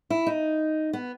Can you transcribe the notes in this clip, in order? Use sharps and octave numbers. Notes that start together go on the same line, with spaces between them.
E4
D#4
B3